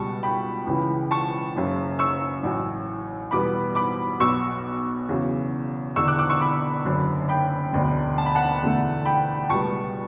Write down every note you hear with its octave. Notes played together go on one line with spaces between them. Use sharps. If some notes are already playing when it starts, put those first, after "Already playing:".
Already playing: C#2 B2 G3 A5 C#6
G5 B5
C#2 C#3 E3
A5 C#6
F#1 F#2 C#3
C#6 E6
A1 A2 F#3
E2 B2 G3 B3 B5 D6
B5 D6
B1 B2 F#3 C#6 E6
E2 C#3 F#3
E1 E2 D3 C#6 E6
D6 F#6
D6 F#6
C#6 E6
B5 D6
F#1 F#2 D3 F#3
G5 B5
E1 D2 D3
A5
B5
F#5 A5
E1 E2 D3 A3
G5 B5
C#2 B2 G3 B3 A5 C#6